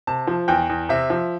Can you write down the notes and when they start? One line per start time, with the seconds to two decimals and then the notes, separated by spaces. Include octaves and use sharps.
0.07 C3 A5
0.27 F3
0.48 E2 G5
0.69 E2
0.89 C3 E5
1.10 F3